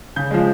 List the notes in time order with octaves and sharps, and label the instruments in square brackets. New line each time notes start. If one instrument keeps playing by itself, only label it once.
[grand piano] C#3 G6
F3 G#3